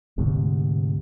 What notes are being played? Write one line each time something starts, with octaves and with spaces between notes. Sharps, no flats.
D2 G#2 C3